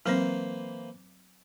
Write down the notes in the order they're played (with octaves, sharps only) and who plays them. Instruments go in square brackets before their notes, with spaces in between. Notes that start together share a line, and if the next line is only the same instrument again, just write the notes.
[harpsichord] E3 A#3 C5 [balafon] F#3 C4